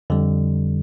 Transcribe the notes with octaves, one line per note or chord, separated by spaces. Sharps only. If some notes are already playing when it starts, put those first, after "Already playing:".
F2 D3 G3